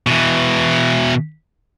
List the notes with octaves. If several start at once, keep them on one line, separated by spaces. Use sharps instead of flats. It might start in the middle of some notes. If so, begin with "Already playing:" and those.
B2 E3